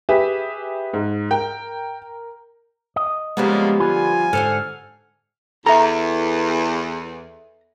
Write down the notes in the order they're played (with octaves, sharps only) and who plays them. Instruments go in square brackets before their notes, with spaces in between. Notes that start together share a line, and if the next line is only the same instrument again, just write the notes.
[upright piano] G4 G#4 E5 [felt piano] B4
[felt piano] G#2
[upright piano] A#4 [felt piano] G5
[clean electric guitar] D#5
[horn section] A#2 C#3 A#3 [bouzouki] F3 G3 B3 [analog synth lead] G#3
[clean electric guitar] D3 B4 [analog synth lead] F4 [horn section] G#5
[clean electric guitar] G#2 D3 [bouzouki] A4 C5 F#5 [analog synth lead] F6
[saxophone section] E2 [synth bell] A4 E5 [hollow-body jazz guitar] A#5